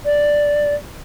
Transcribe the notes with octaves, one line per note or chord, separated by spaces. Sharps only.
D5